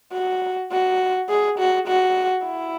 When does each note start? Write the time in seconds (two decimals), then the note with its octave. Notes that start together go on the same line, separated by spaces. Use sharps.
0.13 F#4
0.72 F#4
1.29 G#4
1.59 F#4
1.88 F#4
2.47 E4